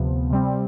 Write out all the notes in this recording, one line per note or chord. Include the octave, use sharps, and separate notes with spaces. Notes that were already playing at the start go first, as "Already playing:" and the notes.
Already playing: D2 C3 F3 B3
C3 G3 C4